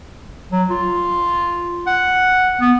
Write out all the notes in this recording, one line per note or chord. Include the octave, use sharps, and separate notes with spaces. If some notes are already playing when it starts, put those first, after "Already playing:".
F#3
F4
F#5
B3